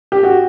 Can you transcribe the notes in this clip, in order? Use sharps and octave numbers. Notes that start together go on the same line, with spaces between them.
G4
F#4